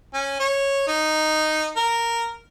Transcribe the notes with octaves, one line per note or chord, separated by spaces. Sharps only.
C#4
C#5
D#4
A#4